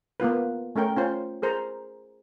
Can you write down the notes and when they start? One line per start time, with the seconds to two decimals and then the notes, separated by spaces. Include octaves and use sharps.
0.20 A#3 B3 F4 B4
0.76 A3 C#4 A#4 G5
0.96 C#4 F4 C5
1.42 G#4 A#4 C5 A#5